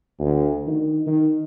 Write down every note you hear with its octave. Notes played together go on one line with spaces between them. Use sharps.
D2
D#3
D#3